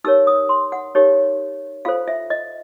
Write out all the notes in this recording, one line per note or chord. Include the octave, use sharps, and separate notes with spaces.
D#4 G4 A#4 C#5 E6
D#6
C6
F#5
D#4 G4 A#4 C#5
F4 A4 C5 F5
E5
D#5